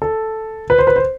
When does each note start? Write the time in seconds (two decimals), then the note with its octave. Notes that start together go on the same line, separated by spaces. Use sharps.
0.02 A4
0.70 B4
0.78 C5
0.87 B4
0.96 C5